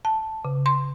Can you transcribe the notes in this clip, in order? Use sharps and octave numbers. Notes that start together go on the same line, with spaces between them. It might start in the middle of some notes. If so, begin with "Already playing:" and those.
A5
C#3
C6